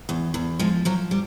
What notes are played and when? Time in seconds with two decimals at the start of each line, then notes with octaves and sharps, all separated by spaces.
0.09 E2
0.34 E2
0.59 F3 G#3
0.85 F3 F#3
1.11 G3